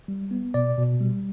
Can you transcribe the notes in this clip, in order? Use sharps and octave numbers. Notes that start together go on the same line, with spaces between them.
G3
B3
B2 D5
B2
G3